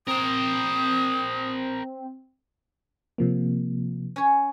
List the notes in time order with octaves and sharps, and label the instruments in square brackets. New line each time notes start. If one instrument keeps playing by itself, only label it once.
[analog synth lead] C4 [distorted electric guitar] A#4 C5 [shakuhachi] D#6
[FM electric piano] C3 F3 A#3
[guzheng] C#4 C#5